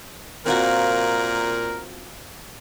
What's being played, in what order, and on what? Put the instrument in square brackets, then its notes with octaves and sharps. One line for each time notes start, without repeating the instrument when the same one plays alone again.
[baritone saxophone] A#2 [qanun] C4 F4 F#4 [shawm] A#4